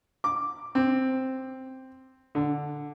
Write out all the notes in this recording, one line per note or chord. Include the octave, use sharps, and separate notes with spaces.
D6
C4
D3